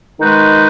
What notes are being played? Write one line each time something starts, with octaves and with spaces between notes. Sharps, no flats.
D#3 G#3 D#4 F#4 B4